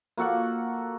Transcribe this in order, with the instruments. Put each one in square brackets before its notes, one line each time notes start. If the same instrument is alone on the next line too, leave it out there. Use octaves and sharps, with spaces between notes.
[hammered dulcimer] A#3 F#4 A4 F#5